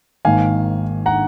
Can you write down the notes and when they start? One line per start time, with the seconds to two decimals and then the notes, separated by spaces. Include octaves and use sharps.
0.25 G#1 G#2 D#3 A#3 F5 G#5
1.06 F#5 A#5